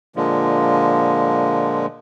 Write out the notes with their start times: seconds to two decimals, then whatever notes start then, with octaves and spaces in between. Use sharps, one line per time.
0.16 A#2 D3 F3 G#3